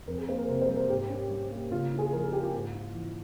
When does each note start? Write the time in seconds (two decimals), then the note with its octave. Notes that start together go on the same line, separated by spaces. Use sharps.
0.07 F2 A#4
0.18 G#4
0.28 A#3 C5
0.38 A#4
0.48 C3 A#4
0.62 C5
0.69 G3
0.76 A#4
0.90 G#2 G4
1.09 C#4
1.31 G3
1.51 A#3
1.71 C#3 F4
1.92 E4
1.99 G#4
2.13 F3 A#4
2.24 G#4
2.33 A#3 G4
2.43 F4
2.54 G#2
2.74 E4
2.94 E3